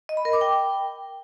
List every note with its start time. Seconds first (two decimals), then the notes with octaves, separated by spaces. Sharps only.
0.09 D#5
0.17 B5
0.25 A#4
0.33 D6
0.41 G5